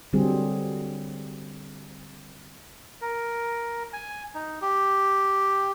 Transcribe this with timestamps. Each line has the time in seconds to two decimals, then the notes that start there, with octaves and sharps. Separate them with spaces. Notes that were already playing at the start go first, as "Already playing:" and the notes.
0.13 D3 F#3 G3 C4 G#4
3.01 A#4
3.93 G#5
4.34 D#4
4.62 G4